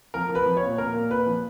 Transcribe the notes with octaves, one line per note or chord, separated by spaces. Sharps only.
F3 A#4
F3
B4
F3
C#5
A#2
A#2 A#4
A#2
A#2 B4
F3